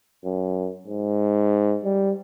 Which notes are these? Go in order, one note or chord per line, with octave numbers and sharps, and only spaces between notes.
F#2
G#2
G3